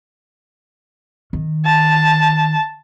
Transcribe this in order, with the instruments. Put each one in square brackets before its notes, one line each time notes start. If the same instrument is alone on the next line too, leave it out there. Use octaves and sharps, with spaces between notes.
[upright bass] D#3
[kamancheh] A5